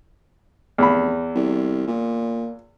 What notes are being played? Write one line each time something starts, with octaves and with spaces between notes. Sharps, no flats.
F1 E2 B5
C2
A#2